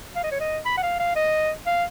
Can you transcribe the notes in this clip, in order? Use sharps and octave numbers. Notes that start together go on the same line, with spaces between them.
F5
D#5
C#5
D#5
B5
F#5
F5
F5
D#5
F5